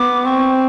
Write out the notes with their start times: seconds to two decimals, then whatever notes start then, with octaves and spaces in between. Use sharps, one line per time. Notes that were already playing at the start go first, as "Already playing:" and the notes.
Already playing: B3 D6
0.25 C4 C#6